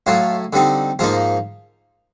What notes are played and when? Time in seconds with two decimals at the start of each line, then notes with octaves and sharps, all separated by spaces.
0.06 A2 F#3 A3 F4
0.53 D3 G3 C4 D#4
0.99 G#2 F3 A#3 D#4 F4